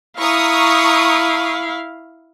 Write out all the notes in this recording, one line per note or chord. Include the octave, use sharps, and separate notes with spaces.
E4 F5 A#5 C#6 D#6